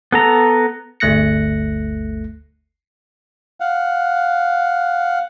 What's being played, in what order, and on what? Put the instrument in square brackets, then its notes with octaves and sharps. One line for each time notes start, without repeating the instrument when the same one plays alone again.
[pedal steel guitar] B3 A4 A#5
[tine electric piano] G1 D2 A3 F#6 A#6 C#7
[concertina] F5 F#5